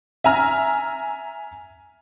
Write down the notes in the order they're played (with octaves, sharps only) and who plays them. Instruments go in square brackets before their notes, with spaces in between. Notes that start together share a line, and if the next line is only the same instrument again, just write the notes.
[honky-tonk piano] E5 G#5 A#5 F6